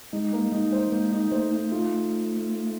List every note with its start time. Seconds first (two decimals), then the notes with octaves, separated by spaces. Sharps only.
0.13 G#3 D#4
0.33 A#3
0.52 G#3 D#4
0.72 C5
0.91 G#3 A#3
1.11 D#4
1.31 A3 C5
1.51 D#4
1.71 F4